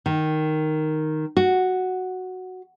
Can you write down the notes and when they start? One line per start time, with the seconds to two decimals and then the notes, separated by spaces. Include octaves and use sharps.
0.06 D#3
1.37 F#4